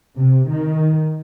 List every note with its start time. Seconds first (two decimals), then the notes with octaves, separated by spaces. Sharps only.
0.18 C3
0.50 D#3